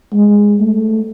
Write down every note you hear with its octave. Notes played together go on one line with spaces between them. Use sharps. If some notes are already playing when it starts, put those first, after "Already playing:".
G#3
A3